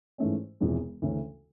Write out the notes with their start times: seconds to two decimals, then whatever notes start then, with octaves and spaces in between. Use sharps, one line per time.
0.18 G#2 E3 A3 C#4
0.60 E1 E2 C3 F3 G#3
1.02 D2 C#3 E3 A3 C#4